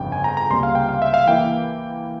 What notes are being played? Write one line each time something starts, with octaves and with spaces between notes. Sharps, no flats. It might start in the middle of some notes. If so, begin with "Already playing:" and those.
Already playing: G1 F2 C#3 G5
G#5
A#5
A#5
C#2 C3 G3 A#3 C6
F5
G5
F5
E5
F5
E3 A#3 E4 G5